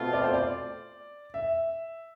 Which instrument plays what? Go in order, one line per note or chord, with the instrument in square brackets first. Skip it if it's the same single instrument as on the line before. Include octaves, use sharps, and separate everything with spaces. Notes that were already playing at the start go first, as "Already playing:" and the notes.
Already playing: [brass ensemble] B2 A3 C4 F4
[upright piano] D5
C5
D5
E5